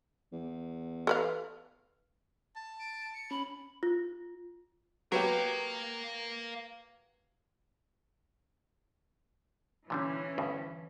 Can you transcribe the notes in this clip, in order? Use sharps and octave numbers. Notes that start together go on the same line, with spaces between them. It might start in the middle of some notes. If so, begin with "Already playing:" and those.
E2
A4 B4 F5
A5
D7
C#7
C#4 B5
F4
F#3 B3 G4 A#4 F5
A#2 D3 E3 G3 C#4
D2 G2 B2